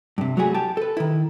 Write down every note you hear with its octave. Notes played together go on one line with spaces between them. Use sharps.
G2 C3
F#3 G3 A3 E4 F#4 G#4
G4 G5 A5
A4 B4
D#3 E4